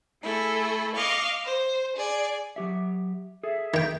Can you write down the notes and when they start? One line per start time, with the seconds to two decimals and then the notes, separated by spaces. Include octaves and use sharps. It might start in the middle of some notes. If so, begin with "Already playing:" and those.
0.22 A3 E4 G#4 A4
0.94 D#5 F5 C#6 D6
1.44 C5
1.96 G#4 D5
2.56 F#3 G4 E5
3.43 G#4 A4 E5
3.74 D#3 G5